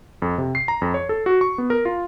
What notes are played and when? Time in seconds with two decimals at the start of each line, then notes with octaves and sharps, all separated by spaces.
0.22 F2
0.38 C3
0.55 C7
0.68 A#5
0.82 F2
0.94 C#5
1.09 A4
1.26 F#4
1.41 C#6
1.58 B3
1.70 A#4
1.85 F4